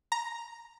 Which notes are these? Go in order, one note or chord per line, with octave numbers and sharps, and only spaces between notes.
A#5